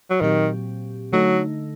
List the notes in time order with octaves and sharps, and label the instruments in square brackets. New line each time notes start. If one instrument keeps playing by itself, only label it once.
[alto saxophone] F#3
[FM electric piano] A#2 F#3 C4 G4 [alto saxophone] D#3
[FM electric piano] D3 A3 D#4 [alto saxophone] F#3